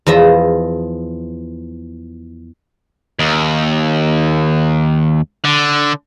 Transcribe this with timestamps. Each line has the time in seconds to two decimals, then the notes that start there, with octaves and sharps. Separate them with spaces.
0.06 E2 F3 D#5 E5
3.19 D#2
5.45 D3